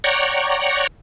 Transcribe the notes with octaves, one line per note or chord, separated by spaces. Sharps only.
C#5 D5 F#5 G5 A#5 C#6